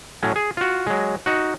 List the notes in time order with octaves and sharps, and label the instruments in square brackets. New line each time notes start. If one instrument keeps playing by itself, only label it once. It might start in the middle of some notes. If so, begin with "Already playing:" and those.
[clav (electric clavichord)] A2 F#3 C#4
G#4
F4 F#4
F#3 G#3
D#4 F#4